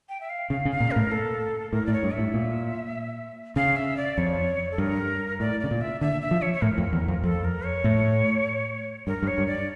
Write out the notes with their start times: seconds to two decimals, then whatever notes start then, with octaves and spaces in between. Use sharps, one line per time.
0.09 G5
0.21 E5
0.29 F5
0.50 C#3 F5
0.65 C#3
0.71 F5
0.80 A#2
0.91 A2 A#4
1.12 A4
1.73 A2 A#4
1.86 A2 D5
1.93 C#5
2.03 G2
2.13 E5
2.19 A2
2.34 A#2
3.56 C#3 F5
3.76 E5
3.97 D5
4.18 F2 C#5
4.71 A4
4.78 G2 A#4
5.40 A2 D5
5.60 C#3 D5
5.71 A#2
5.81 E5
6.01 D3 E5
6.22 E5
6.31 F3
6.42 C#5
6.54 C#5
6.62 A2 A#4
6.78 F2
6.93 E2
7.08 F2
7.23 F2 A4
7.44 A#4
7.65 C#5
7.84 A2
9.07 G2 A#4
9.22 G2
9.27 C#5
9.38 G2
9.48 D5